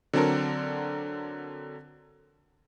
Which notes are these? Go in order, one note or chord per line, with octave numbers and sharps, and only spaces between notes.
D3 F#3 C4 D4 A4 A#4